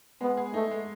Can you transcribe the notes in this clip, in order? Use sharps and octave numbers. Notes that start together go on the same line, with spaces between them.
G#3 B3
G#4
A3 D#4
G#3